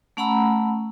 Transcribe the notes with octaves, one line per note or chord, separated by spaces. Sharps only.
A3 C#4 F#5 A#5 B5 E6